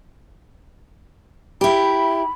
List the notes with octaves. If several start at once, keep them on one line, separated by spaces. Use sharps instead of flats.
E4 G4 B5